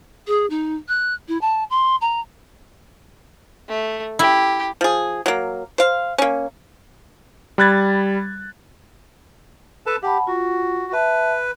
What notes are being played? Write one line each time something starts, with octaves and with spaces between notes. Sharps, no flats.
G#4
D#4
F#6
E4
A5
C6
A#5
A3
E4 G4
F3 G#4
F#3 A#3
C5 F5
A#3 C#4
G3 B5 F#6 G#6 A6
A4 B4 A5
G4 F#5 A5 B5
F4 F#4
B4 E5 A5